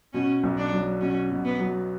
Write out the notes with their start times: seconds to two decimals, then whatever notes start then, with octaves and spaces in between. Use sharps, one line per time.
0.13 B2 C#4
0.43 B1
0.57 D4
0.73 F#3
1.01 B2 C#4
1.31 B2
1.45 B3
1.59 F#3